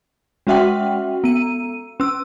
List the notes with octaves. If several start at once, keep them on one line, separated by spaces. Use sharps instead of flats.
G#3 C#4 F#4 E5 F#5 G5
B3 D#7
C#4 E6